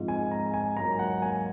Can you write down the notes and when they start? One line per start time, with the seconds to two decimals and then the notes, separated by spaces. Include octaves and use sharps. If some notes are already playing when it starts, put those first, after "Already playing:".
Already playing: G#2 F3 G#3 C4
0.08 G#5
0.31 A#5
0.54 G#5
0.77 G#2 F#3 A#3 A#5
0.99 F#5
1.22 G#5